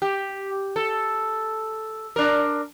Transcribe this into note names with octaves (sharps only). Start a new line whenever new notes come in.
G4
A4
D4 A#4